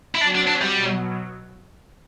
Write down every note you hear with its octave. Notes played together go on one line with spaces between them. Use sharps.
E4
F#3 C4 D4 F#4
D4
D4
G3
B2 F#3